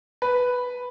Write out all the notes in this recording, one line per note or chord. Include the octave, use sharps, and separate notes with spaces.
B4